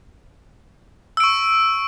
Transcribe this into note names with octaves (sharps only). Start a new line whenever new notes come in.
C#6 E6 D7